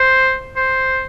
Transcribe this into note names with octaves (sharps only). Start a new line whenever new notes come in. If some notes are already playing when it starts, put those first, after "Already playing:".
Already playing: C5
C5